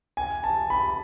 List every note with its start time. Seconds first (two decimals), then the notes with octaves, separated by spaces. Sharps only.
0.17 G#5
0.44 A5
0.70 B5